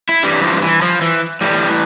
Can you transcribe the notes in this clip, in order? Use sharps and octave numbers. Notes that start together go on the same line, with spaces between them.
E4
G2 E3 G3
F3
E3
F3
E3
A2 E3 G3